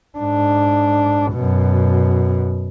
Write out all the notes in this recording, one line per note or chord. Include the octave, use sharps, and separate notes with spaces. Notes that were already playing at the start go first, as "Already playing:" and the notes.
G#2 D4
F#2 B2